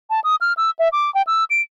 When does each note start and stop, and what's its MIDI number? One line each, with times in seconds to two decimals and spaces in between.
0.10 0.20 81
0.24 0.35 87
0.41 0.53 89
0.57 0.70 88
0.79 0.88 76
0.92 1.13 86
1.15 1.22 79
1.27 1.44 88
1.50 1.62 98